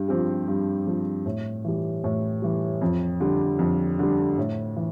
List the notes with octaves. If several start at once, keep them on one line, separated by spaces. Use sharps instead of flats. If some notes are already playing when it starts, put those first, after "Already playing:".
Already playing: G2
F3 C4 G4
G2
F3 C4 G4
A2
E3 G3
A2
E3 G3
F2
D3 G3
F2
D3 G3
A2
E3